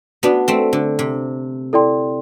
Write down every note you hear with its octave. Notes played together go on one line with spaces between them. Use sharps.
B3 D4 F#4 B4 D5
A3 C4
D3
C3
E4 A4 D5 G5 C6